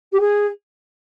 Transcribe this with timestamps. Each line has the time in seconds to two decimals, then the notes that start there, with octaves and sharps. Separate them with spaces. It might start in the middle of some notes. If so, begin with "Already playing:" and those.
0.12 G4
0.20 G#4